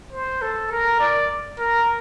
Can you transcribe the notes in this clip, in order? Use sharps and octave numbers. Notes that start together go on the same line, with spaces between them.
C5
A4
A#4
D5
A#4